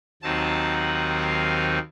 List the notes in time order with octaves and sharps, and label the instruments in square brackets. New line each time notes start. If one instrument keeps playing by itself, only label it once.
[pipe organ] D#2 D#3 F#3 C4 D#4 A5
F#5
F5